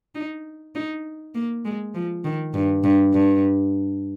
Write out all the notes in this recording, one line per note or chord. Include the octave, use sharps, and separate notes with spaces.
D#4
D#4
A#3
G#3
F3
D#3
G2
G2
G2